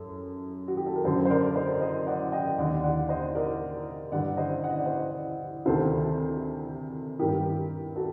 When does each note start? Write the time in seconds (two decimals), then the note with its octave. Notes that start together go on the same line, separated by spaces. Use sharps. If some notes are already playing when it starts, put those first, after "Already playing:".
Already playing: F#2 A4
0.68 F#4
0.77 G4
0.86 A4
0.95 A#4
1.04 F#2 D3 A4 C5
1.25 C5
1.30 A#4 D5
1.56 C5 D#5
1.81 C5 D#5
2.07 D5 F#5
2.32 D#5 G5
2.58 D#2 D3 D5 F#5
2.84 D5 F#5
3.09 C5 D#5
3.35 A#4 D5
4.12 G2 D3 D5 F#5
4.37 C5 D#5
4.64 F#5
4.70 D#5
4.78 D5
4.85 C5 D#5
5.66 D2 C3 D#3 A4 C5
7.19 G2 D#3 G4 A#4
7.96 F#4 A4